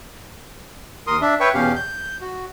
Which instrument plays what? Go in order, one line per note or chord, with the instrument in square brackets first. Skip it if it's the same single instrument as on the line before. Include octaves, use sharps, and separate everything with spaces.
[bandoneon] D#2 A#4 C6 D#6
D4 E5
B4 C#5 E5 G5 C#6
E2 B2 C#4 G4 F5
G6
F#4